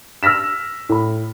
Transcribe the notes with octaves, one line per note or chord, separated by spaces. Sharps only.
E6 F6 A#6 B6 E7
A2 B5